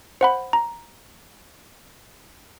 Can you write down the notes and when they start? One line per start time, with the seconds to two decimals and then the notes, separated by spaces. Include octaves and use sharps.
0.21 C5 F#5 B5
0.53 A#5